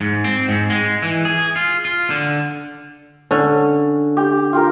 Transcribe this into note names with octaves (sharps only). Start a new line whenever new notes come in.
G#2
C4
G#2
G#3
E3
G#4
F4
F4
D3
D3 C#4
G4
F4 G4 A#4